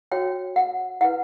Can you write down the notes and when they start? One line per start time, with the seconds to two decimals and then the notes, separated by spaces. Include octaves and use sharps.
0.11 F#4 C#5 G5
0.56 F#5
1.01 E4 B4 F#5